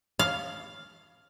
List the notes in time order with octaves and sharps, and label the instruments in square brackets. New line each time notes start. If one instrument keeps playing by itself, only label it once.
[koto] F5